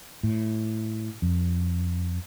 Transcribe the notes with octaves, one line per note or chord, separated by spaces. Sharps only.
A2
F2